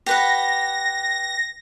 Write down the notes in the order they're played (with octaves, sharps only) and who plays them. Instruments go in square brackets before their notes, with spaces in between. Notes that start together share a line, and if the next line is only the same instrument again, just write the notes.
[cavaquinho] G4 B4 F#5 [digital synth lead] A#6